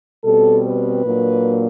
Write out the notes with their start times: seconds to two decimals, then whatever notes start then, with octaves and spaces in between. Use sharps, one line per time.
0.24 B2 G3 C4 A4
0.64 B4
1.04 A#2 F#3 A#3 D4